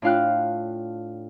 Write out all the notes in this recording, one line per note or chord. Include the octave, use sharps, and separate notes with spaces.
A2 D4 F4 F5 G5 F#6